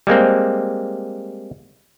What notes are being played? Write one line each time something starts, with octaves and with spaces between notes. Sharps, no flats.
G3 G#3 A#3 C4